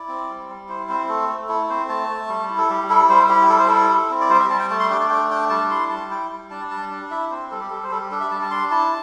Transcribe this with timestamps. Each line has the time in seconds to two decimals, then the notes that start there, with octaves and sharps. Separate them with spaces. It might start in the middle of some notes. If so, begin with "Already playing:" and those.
Already playing: E4 D5
0.08 C4
0.29 G3
0.49 G3
0.69 E4 C5
0.89 C4 C5
1.09 A3 A4
1.29 A3
1.49 E4 A4
1.70 C4 C5
1.89 A3 A5
2.09 A3
2.29 G3
2.50 E4
2.58 A4
2.70 G3 G4
2.89 E4 A4
3.09 G3 C5
3.29 E4 G4
3.49 G3 A4
3.59 C5
3.67 E4 A4
3.90 E4
4.10 C4
4.21 D5
4.30 G3 C5
4.39 E5
4.50 G3 A5
4.59 G5
4.70 A3 A5
4.79 C6
4.90 D4 G5
5.00 D5
5.10 A3 G5
5.30 D4 G5
5.50 G3 A5
5.70 E4 C6
5.90 G3 A5
6.11 E4 G5
6.30 G3
6.51 D4 A5
6.71 G3 A5
6.91 D4
7.11 E4 E5
7.31 C4 C5
7.51 G3 A4
7.60 G4
7.70 G3 A4
7.83 C5
7.91 G3 A4
8.01 G4
8.11 D4 A4
8.21 E5
8.31 G3 A5
8.42 A5
8.51 D4 C6
8.71 E4 A5